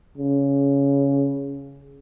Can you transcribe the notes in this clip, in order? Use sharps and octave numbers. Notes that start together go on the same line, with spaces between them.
C#3